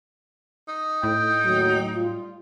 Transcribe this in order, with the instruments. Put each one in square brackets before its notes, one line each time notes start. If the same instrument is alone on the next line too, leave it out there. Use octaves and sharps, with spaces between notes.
[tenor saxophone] D#4
[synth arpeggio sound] A2 [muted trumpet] G5
[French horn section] D#2 F#3
G3 F4